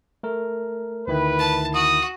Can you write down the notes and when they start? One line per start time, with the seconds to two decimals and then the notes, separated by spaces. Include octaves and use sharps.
0.23 A3 A#4
1.08 D2 D#3 E4 B4
1.39 A5
1.75 F#4 D#6